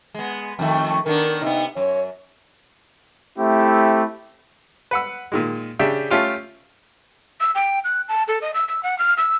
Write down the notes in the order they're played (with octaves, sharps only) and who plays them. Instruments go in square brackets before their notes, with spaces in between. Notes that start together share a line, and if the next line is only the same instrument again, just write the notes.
[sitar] G#3 B3
F2 D#3 A3
[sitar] D#3 B3 D4 [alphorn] A#4
[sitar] C3 B3 [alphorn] D#4
[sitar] F#2 [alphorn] C#5
[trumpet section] A3 C4 E4 G4
[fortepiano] B4 F#5 E6
A#2 D#3 G#3
C#3 D4 G4 E5
A3 C#4 F4 G4
[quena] E6
G5
F#6
A5
A4
D#5
E6
E6
F#5
F6
E6